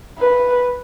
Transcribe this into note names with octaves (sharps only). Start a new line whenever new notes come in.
B4